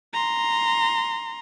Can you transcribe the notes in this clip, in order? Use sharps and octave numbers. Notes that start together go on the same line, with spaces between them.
A#5 C6